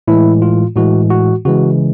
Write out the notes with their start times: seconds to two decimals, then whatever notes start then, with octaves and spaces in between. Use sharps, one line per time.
0.08 A2 E3 G#3 E4
0.42 F4
0.76 A2 E3 G#3 F#4
1.10 F#4
1.45 C#3 E3 G#3 F#4